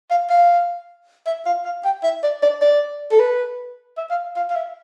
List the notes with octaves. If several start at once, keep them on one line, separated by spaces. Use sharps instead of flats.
F5
F5
E5
F5
F5
G5
E5
D5
D5
D5
A4
B4
E5
F5
F5
F5
E5